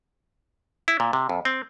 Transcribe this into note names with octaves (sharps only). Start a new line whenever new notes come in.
E4
A#2
C3
F2
C4